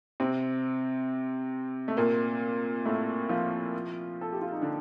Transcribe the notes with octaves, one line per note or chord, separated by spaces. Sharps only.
C3 C4
A3
A#2 A#3
A2 A3
F3 F4
A4
G4
F4
D#4
D3 D4